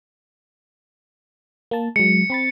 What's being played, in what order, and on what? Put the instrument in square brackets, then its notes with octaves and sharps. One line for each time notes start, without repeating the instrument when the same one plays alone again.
[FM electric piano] A#3 A5
[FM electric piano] F#3 G#3 [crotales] C#7
[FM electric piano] C4 B5 A6